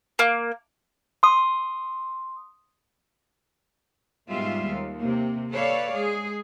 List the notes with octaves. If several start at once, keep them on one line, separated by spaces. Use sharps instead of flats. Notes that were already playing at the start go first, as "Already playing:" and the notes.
A#3
C6 D#6
G#2 B2 G3 G#3 F4 E5
D#2
C3 A#3
A4 B4 C#5 D5 F5
G#3 G#4